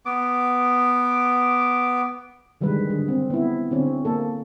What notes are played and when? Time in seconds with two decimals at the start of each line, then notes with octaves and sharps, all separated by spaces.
0.05 B3 D6
2.61 D3 D#3 G3 G#3 B4
2.90 D3 G#4
3.08 C4
3.30 B3 E4
3.71 D3 C4 C#4
4.05 A#3 A4